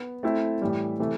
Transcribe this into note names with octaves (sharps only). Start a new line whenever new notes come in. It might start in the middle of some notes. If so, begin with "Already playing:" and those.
Already playing: B3
A3 C4 E4 A4
A2 E3 G3
C3 E3 A3